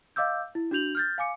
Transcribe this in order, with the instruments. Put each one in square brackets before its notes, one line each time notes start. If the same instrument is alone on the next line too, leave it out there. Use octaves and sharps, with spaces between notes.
[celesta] D#5 F5 D6 E6 G6
E4
D4 F#4 G6 F7 F#7
F6 G6 A6
F5 G#5 D6 C#7